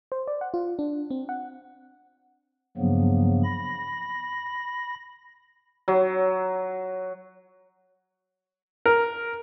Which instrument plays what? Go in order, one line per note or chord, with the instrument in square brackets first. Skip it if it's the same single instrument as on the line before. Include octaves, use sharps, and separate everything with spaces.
[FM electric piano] C5
D5
F#5
F4
D4
C4
F#5
[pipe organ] G2 C#3 F3 F#3 A#3 B3
B5 A#6
[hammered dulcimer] F#3
[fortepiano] A#4